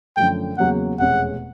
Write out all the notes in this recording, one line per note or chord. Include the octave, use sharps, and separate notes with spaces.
F#2 D3 F3 A3 G5
E2 C#3 F#3 A#3 F#5
F1 E2 B2 G#3 C#4 F#5